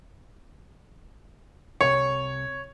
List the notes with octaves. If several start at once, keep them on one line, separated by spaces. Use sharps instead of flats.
C2 C3 C#5 C#6